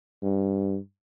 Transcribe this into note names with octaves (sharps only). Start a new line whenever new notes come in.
G2